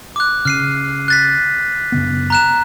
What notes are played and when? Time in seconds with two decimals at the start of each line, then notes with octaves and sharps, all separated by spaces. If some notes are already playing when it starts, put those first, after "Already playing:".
0.16 D6 F#6
0.45 C#3 F6 C7 D#7
1.08 F#6 A6 B6
1.92 F#2 C#3 B3
2.30 A#5 F#6 E7